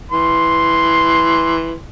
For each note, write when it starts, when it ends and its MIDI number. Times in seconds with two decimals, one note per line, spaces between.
0.11 1.80 52
0.11 1.80 84